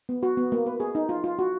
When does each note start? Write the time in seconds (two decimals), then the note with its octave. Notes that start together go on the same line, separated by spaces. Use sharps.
0.09 B3
0.23 F#4
0.37 B3
0.52 A#3
0.66 B4
0.80 G#4
0.95 D#4
1.09 F4
1.24 F4
1.39 F#4